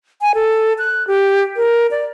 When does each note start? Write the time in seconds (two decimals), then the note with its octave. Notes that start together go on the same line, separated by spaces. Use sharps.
0.21 G#5
0.35 A4
0.78 F#6
1.07 G4
1.56 A#4
1.91 D5